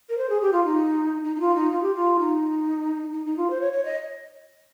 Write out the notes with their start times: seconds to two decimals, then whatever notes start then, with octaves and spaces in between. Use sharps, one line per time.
0.09 A#4
0.17 C5
0.29 G#4
0.41 G4
0.52 F4
0.64 D#4
1.24 D#4
1.35 D#4
1.40 F4
1.55 D#4
1.71 F4
1.82 G4
1.94 F4
2.19 D#4
3.13 D#4
3.25 D#4
3.37 F4
3.50 C5
3.60 C#5
3.72 C#5
3.85 D#5